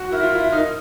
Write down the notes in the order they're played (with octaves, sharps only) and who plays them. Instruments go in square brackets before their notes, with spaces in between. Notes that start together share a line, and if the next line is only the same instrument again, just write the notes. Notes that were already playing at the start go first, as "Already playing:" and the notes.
Already playing: [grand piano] F#4
[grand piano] E4 [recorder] A#4
[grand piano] F4
E4
[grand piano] D#4 [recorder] A#4